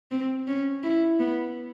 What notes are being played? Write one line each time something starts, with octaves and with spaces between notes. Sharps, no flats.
C4
C#4
E4
B3